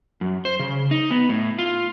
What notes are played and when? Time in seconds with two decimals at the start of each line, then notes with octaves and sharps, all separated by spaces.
0.21 F#2
0.45 C5
0.59 C#3
0.91 D#4
1.11 B3
1.29 A2
1.59 F4